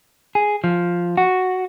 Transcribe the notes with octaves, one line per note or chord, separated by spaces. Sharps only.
G#4
F3
F#4